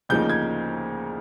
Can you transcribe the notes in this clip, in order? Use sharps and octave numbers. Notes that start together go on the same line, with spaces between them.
D2 C#3 F3 A#3 D#4 G6
G#6